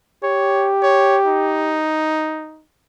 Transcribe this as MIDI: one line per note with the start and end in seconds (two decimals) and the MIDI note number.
0.23 1.82 67
0.23 0.70 73
0.83 1.17 73
1.27 2.63 63